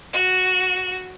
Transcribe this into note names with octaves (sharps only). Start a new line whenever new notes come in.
F#4